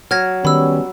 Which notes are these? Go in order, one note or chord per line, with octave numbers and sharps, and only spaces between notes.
F#3 F6 G#6 A#6
D#3 G3 B3 C#4 B5 E6